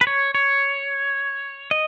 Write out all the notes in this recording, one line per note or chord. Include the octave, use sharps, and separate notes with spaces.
B4
C#5
C#5
D#5